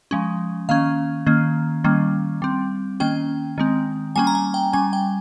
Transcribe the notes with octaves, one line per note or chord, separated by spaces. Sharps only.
F3 G#3 C#4
D#3 A#3 C#4 F5
D#3 A#3 C#4
D#3 G3 A#3 C#4
G3 C4
D#3 A#3 C#4 G5
D#3 G#3 C4
G3 A#3 C#4 G#5
A#5
G#5
G5
G3 C#4 G#5
G5